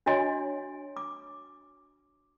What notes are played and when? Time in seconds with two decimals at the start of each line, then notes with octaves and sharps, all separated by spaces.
0.06 D4 F#4 C#5 D#5 G#5 C6
0.97 D6